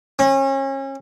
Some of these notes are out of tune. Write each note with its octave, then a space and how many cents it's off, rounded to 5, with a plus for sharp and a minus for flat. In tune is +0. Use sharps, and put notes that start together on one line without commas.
C#4 -35